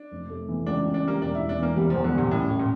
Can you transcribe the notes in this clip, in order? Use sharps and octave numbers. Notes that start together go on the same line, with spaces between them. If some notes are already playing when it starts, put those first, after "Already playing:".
Already playing: D4
F1
A3
E3
C#2 D4
C#4
D4
G3 A#3
E1 D4
E1 E4
D4
E3 A#3
E2 G3
E2 F3
D3
A#2 G3
A1 A2
A1
A#2